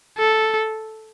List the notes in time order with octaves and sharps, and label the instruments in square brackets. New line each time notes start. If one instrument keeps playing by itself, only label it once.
[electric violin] A4